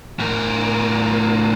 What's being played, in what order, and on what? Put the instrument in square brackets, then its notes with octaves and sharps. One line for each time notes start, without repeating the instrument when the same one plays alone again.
[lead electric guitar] A2 A#4